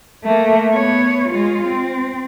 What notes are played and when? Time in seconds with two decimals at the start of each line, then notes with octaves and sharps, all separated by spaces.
0.24 A3 A#3
0.70 B3 C#5
1.29 G#3 F4
1.67 C4